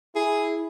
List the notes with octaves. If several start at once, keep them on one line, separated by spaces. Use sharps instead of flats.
E4 G#4